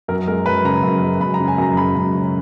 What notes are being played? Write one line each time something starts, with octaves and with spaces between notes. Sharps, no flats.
F#2 A#4
G#3 A#4
F#2 B4
C#3 A#5
F#2
G#3
F#2 B5
A#5
C#3
G#5
F#2 A#5
G#3 B5
F#2
C#3